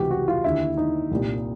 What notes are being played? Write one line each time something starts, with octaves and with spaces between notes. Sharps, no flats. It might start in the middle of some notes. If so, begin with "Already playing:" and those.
Already playing: C#2 C3 E3 F#4 G4
F#4
F4
D#2 D3 E4
D#4
C2 A#2